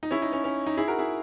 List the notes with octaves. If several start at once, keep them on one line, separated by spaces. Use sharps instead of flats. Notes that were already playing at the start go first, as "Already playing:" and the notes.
D#4
C#4 E4
D#4
C#4
C#4
D#4
E4 G#4
F#4 A#4
E4 G#4